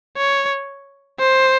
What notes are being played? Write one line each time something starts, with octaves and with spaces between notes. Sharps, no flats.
C#5
C5